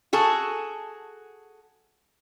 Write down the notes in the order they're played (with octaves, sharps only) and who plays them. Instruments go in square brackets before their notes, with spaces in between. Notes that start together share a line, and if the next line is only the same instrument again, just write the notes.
[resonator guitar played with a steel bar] F#4 G#4 A4